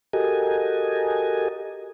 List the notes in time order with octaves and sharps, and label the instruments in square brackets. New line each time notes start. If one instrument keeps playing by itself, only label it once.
[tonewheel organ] F#4 G4 A4 A#4 D#5 G#5